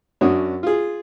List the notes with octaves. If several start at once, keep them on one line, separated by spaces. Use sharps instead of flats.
F#2 C#4 D4 F#4 D#6
F4 G#4